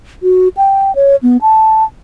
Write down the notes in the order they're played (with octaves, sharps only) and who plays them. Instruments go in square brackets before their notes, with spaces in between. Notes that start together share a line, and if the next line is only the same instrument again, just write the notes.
[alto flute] F#4
G5
C#5
B3
A5